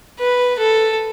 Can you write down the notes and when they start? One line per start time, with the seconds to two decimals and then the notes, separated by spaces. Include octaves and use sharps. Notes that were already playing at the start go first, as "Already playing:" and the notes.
0.19 B4
0.59 A4